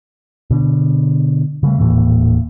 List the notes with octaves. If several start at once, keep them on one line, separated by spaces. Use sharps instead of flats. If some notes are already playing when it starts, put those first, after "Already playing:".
B2 D3
C#3 G3 A3
D#1 A2 E3 A#3